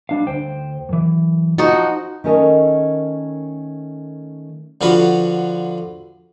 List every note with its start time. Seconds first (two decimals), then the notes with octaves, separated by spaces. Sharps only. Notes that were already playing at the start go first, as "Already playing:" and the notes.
0.09 G3 D4 F5
0.27 D2 C5 G5
0.89 F#2 E3
1.58 F3 D#4 F#4
2.24 D#3 A3 C#4 A4 A#4 D#5
4.81 D3 F3 F4 F#4 B4